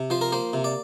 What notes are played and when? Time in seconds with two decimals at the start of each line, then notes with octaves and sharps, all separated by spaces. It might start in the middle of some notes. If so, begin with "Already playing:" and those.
Already playing: C3
0.10 F3 C5
0.21 A#4
0.32 A#3 C5
0.53 C3
0.64 D5